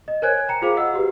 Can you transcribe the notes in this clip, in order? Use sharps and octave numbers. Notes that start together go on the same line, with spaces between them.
D#5
A#4 C5 C#5 G#5 F#6 G#6
G5 A#5 C#7
F4 G#4 C5 F5 D6
D#5 F#5 E6
F#4 G4 B4